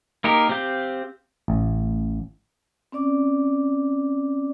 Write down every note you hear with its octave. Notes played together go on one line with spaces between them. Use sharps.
A#3 D#4 G4 A#4
C4 G4 F5 G6
A1
C4 C#4 D5 D6